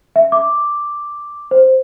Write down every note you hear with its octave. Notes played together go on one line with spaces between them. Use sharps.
E5
D6
C5